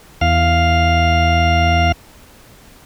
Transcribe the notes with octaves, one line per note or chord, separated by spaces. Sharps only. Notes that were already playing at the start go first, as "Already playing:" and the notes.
E2 F5